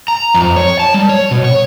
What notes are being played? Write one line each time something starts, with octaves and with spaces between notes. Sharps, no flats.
A#5
F2
C#5
A5
G3
C#5
B2
C#5